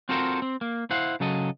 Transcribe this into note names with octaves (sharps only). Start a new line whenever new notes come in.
C4 F4 F#4 A4 A#4 C5
C4
A#3
E4 C5 F5 F#5
C#3 F#3 A4 D#5